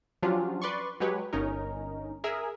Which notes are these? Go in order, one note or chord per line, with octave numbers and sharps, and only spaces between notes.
F3 F#3 C#4 D4 F4 G4
B4 D5 C6 C#6
F#3 G#3 G4 B4 C#5
G1 C#4 D#4 A#4
G#4 A#4 E5